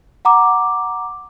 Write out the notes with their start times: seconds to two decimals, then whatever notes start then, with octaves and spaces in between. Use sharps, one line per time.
0.25 F#5 A#5 D6